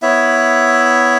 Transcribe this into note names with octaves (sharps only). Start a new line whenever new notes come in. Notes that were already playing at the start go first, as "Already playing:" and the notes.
B3 E4 C#5 E5